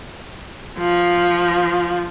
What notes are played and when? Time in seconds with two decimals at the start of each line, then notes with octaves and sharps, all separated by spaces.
0.79 F3